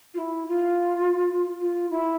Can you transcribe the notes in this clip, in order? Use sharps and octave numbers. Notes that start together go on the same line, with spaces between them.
F4
E4
F4
F4
E4